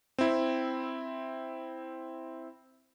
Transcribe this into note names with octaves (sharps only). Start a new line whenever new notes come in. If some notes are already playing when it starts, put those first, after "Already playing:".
C4 E4